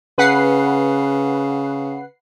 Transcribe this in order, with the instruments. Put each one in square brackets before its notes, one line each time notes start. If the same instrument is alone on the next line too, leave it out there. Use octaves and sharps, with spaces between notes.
[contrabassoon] C#3 [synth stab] B4 F#5 C7